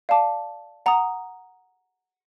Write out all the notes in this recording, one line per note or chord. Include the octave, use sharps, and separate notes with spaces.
D5 F5 A5 D6
F#5 A#5 D#6